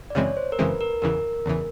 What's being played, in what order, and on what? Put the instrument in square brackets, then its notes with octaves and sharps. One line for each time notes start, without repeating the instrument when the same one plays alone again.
[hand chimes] D5
[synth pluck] F#2 C#3 E3 G#3 C4 [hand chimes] C#5
[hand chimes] C5
A#4
[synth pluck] F#2 C#3 E3 G#3 C4 [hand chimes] B4
[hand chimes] A#4
[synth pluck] E2 C#3 E3 [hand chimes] A#4
[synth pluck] E2 C#3 E3